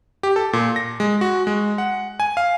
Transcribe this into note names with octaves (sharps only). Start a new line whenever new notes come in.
G4
A4
A#2
A#6
G#3
F#4
G#3
F#5
G#5
F5